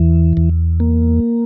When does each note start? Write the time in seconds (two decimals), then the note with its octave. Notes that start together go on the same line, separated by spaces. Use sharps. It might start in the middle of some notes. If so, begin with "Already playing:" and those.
Already playing: E2 E3
0.37 E2
0.80 A#3